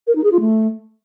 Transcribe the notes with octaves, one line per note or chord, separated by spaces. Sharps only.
A#4
D#4
G#4
F4
A3